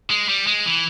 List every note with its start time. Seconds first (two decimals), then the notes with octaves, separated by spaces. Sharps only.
0.10 G#3
0.29 G3
0.47 G#3
0.66 E3